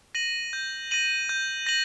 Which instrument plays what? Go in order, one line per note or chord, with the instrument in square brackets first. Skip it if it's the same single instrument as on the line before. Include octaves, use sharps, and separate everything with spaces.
[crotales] A#6 D#7 F#7
G6
A#6 D#7 F#7
G6
A#6 D#7 F#7